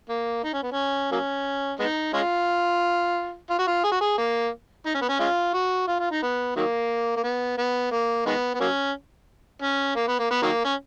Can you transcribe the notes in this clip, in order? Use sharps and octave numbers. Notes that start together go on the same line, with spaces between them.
A#3
D#4
C#4
B3
C#4
F#3 A#3 C#4
G#3 B3 D#4
G#3 C#4 F4
F4
F#4
F4
G#4
F#4
G#4
A#3
D#4
C#4
B3
C#4
G#3 C#4 F4
F#4
F4
F4
D#4
B3
D#3 F#3 A#3
A#3
B3
B3
A#3
D#3 G#3 B3
B3
F#3 A#3 C#4
C#4
A#3
B3
A#3
B3
D#3 F#3 A#3
C#4